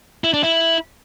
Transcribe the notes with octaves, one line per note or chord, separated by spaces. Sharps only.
E4
D4
E4